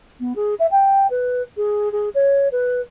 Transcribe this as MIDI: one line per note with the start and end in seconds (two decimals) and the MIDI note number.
0.20 0.33 59
0.36 0.54 68
0.59 0.66 76
0.71 1.07 79
1.10 1.42 71
1.57 1.91 68
1.92 2.09 68
2.14 2.48 73
2.51 2.81 71